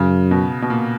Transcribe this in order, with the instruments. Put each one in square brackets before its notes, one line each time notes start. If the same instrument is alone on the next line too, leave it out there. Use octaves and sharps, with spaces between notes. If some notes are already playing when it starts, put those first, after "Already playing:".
Already playing: [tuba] F#2 [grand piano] C#3
[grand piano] B2
B2
A#2